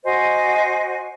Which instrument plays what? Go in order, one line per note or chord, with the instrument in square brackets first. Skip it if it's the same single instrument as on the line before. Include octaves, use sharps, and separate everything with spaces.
[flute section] F#4 C5 D#5 G#5